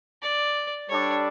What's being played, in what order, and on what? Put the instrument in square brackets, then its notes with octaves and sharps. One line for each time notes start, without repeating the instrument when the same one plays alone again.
[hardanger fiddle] D5
[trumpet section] G3 D4 A4 D5 [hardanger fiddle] C#5